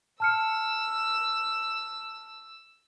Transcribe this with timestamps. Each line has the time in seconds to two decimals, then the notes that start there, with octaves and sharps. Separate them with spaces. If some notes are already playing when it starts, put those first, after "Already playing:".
0.20 A5 E6 F6 C#7